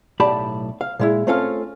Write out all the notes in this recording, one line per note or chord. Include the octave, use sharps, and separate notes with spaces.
B1 A2 G4 D5 A5 B5
F5
A#2 G#3 E4
A3 C4 C#4 F4 A4 F5